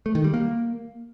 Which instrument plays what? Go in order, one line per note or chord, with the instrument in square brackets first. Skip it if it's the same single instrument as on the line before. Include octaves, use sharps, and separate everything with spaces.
[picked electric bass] A3
D#3
G3
A#3